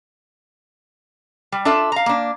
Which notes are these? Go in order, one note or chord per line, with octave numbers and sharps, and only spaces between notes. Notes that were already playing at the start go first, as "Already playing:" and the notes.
G3
D4 F4 A4 E5
F5 A#5
A#3 D4